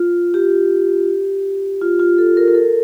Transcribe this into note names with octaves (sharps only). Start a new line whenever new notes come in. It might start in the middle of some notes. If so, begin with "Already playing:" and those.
Already playing: F4
G4
F4
F4
A4
A#4
A#4
A4